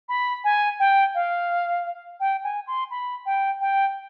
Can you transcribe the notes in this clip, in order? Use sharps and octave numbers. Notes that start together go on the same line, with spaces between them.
B5
G#5
G5
F5
G5
G#5
C6
B5
G5
G5